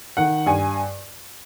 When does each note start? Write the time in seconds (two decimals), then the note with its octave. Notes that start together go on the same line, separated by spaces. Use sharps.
0.17 D#3 F#5
0.46 G2 G#5